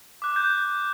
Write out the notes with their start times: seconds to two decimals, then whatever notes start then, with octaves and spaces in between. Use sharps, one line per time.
0.22 D6 F#6
0.36 G6